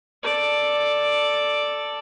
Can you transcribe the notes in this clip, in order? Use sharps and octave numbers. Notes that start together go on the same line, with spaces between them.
A4 D5